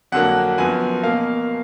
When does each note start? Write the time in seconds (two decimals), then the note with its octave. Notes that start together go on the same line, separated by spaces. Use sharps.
0.12 F2 D3 F#3 A#3 F#5
0.58 F#2 F3 B3 G#5
1.03 B2 A#3 F5